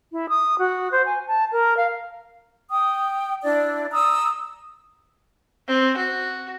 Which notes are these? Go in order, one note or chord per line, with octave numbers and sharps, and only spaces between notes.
E4
D#6
F#4
C5
G#5
A5
A#4
F5
G5 D#6
D4 E4 D5
A#5 D#6 E6
C4
F#4